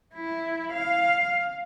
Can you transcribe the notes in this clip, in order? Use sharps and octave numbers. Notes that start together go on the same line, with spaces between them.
E4
F5